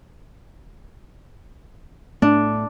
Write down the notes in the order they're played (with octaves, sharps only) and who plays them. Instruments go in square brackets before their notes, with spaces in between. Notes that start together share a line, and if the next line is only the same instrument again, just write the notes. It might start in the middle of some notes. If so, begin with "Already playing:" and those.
[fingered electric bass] A2 A3 [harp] D4